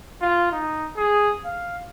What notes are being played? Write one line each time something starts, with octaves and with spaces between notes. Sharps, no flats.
F4
D#4
G#4
F5